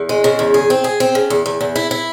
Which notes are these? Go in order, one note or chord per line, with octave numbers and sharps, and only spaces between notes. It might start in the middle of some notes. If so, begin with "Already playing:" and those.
Already playing: E2
G#3
C#3
E2
G#4
C4
G#4
C4
C#3
E2
E2
E2
E4
E4